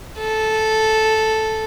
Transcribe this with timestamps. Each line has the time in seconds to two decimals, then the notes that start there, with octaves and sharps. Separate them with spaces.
0.18 A4